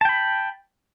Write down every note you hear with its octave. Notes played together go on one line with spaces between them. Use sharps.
G5 A5 B5